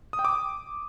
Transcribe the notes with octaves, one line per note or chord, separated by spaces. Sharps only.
D#6
G5
D6